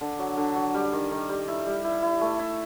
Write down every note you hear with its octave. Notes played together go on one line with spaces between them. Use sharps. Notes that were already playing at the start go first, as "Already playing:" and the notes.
D3
F#3
D3
F#3
G3
D#3
D#3
G3
E4
G3
E4
E4
A3
E4